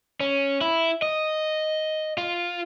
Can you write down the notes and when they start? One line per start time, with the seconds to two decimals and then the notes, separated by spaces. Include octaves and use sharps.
0.20 C#4
0.61 E4
1.02 D#5
2.18 F4